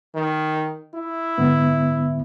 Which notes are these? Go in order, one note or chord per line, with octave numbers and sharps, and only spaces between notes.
D#3
E4
G#2 D3 B3